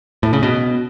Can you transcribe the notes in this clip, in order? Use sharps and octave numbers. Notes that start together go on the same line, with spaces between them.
A2
C#3
B2